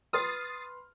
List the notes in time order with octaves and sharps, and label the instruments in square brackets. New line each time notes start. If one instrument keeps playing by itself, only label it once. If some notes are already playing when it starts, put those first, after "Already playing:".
[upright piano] B4 C6 F6 [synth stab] D#6 A6 C7